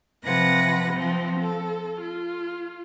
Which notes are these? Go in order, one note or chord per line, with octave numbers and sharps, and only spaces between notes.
C3 F3 B4 F#5 A#6
F3 C4
A4
F4